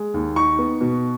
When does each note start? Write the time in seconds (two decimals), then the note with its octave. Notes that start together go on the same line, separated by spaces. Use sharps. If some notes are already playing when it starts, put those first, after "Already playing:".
Already playing: G#3
0.14 D#2
0.36 D#4 C#6
0.59 B3
0.81 B2